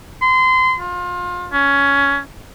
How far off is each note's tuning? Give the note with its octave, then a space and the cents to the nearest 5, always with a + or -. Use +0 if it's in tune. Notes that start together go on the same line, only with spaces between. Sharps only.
C6 -30
F4 +25
C#4 +15